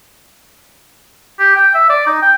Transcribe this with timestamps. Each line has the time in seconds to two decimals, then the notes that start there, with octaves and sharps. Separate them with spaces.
1.40 G4
1.56 G5
1.74 E5
1.90 D5
2.07 D#4
2.22 G5